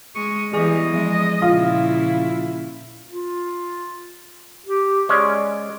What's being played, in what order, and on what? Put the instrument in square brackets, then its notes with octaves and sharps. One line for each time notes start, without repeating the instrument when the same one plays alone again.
[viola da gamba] G#3 D#5 [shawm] C#6
[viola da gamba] E3 G3 B3 [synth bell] G#4 G#5 C#6 [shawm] D#5
[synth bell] F3 E5 [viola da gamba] G#3
[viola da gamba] A#2 C#3 E4 [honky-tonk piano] F4
[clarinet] F4
G4
[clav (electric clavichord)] G#3 C#4 [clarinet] D5